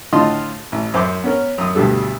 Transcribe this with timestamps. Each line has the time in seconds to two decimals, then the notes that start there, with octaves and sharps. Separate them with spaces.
0.13 A2 D3 F4 D#5 C6
0.72 A1
0.94 F#2 C5 E5 D6
1.24 B3 C#4 A#4
1.58 F#2 D#6
1.75 D2 G2 B2 G3 A4